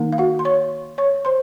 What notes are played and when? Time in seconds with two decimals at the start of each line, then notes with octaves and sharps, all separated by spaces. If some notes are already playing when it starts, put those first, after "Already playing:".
Already playing: D#3 A#3 D#4
0.13 F5
0.18 F#4 F#5
0.39 C6
0.45 C#5 C#6
0.98 C#5 C#6
1.25 C5 C6